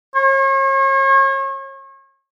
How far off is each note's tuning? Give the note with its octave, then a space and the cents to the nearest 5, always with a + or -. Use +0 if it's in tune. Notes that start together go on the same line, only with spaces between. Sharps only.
C#5 -40